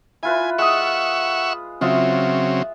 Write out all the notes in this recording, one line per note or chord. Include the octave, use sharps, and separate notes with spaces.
E4 F4 B4 G#5
G#3 E5 F#5 C#6 D#6
C#3 F#3 C4 F4 D#5 E5